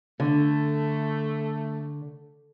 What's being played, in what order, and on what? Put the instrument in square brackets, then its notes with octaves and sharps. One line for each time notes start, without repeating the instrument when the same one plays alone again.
[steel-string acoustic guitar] D3 [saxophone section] A3